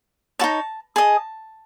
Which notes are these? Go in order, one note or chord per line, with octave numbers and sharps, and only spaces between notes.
D#4 F#4 C#5 A5
G#4 D#5 A5